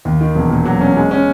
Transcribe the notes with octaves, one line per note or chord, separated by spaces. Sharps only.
D#2
D#3
E1
A#2
F#3
C#4
G#3
C#4